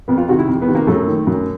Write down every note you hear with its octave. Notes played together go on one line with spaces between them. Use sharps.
F2 B3
F4
C3 D#3 F#4
E4
F2
B3
C3 D#3
A#3
F#2 A3
D#3
F#2